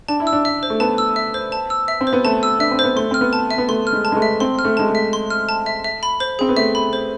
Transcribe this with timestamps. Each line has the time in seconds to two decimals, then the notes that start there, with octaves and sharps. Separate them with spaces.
0.08 D4 A5
0.20 E4
0.27 E6
0.33 D4
0.45 E5
0.63 C5
0.70 A3
0.80 B3 A5
0.98 E6
1.16 E5
1.34 C5
1.52 A5
1.70 E6
1.88 E5
2.01 C4
2.07 C5
2.13 B3
2.25 A3 A5
2.43 E6
2.59 D4 E5
2.71 C4
2.79 B3 C5
2.96 A3 C6
3.11 C4 F6
3.21 B3
3.33 A5
3.51 E5
3.58 B3
3.68 A3 C6
3.87 F6
3.93 G#3
4.05 A5
4.12 G#3
4.17 A3
4.22 E5
4.40 C4 C6
4.59 F6
4.65 A3
4.77 G#3 A5
4.88 A3
4.95 E5
5.13 C6
5.30 F6
5.49 A5
5.66 E5
5.84 E5
6.03 B5
6.20 C5
6.39 C4 G#4
6.49 B3
6.57 A3 E5
6.75 B5
6.93 C5